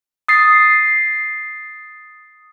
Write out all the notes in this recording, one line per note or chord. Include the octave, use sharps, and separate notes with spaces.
D#6 A6 C7